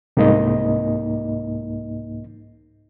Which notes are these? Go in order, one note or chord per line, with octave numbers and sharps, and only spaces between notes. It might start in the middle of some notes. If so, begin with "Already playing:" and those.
C2 G#2 A#3 D#4 D#5